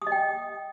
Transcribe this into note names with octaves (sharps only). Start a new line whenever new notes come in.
D#6
D#5
G5